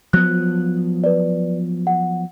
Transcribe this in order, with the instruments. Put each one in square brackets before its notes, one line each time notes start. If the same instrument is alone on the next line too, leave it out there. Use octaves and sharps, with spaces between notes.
[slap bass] F3 F#3 B3 [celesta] F#6
[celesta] B4 D5
F#5